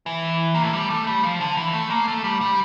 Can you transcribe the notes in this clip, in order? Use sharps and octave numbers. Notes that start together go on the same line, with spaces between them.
E3
A#3
A3
G3
A3
G3
F3
D3
E3
A3
A#3
A3
G3
G3